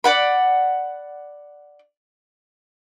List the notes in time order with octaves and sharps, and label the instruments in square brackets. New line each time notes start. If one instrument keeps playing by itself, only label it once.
[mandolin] D5 F#5 B5